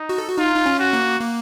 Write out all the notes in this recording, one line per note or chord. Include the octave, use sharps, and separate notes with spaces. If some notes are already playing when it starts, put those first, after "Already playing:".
Already playing: D#4
F#4
A4
F#4
D#4 F4
D#4
C#4
F#4
A#3
A#3